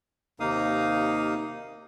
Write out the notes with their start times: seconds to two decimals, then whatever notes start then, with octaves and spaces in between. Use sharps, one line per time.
0.40 D#2 C3 A#3 D#4 F5 D#6